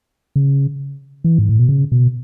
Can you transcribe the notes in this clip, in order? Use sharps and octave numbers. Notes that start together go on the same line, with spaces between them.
C#3
E3
G#2
A2
B2
C#3
B2